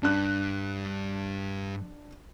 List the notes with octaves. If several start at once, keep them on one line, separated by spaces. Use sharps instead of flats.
G2 D4 F#6